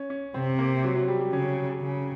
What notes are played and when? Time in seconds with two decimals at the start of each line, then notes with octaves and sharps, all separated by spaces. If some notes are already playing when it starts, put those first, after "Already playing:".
Already playing: C#4
0.10 C#4
0.34 C3 C4
0.59 A#3
0.84 F#3
0.95 F#3
1.08 G3
1.20 G3
1.32 C#3 C#4
1.81 C#3